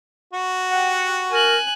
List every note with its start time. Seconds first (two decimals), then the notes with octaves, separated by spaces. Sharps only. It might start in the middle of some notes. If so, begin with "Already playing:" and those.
0.33 F#4
0.71 G4 F#5
1.31 A#4 G#5 F#6